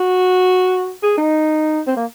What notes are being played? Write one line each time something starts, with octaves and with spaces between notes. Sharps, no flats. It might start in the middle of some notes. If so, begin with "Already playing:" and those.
Already playing: F#4
G#4
D#4
C4
A#3